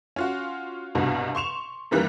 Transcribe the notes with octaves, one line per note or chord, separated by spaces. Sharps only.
C#4 F4 F#4
C2 G2 B2
C6 C#6 E7 F7
F#2 D#3 E3 G3 A#3 F#6